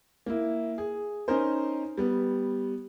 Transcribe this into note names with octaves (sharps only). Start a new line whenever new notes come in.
A#3 E4
G#4
C#4 D#4 A#4 C5
G3 B3